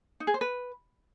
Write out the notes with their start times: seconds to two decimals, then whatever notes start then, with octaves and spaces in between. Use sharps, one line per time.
0.20 D#4
0.27 G#4
0.34 C5
0.41 B4